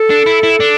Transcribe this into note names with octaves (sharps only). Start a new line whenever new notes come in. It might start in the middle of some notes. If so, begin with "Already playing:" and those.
Already playing: A4
D4
E4
E4
D4